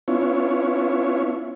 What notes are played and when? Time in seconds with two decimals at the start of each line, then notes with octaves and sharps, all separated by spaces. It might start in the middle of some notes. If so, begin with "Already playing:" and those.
0.08 B3 C#4 D4 E4 F4 C#5